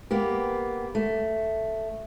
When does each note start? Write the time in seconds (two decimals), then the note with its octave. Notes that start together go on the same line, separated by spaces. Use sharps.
0.11 A#3 B3 G4
0.95 A3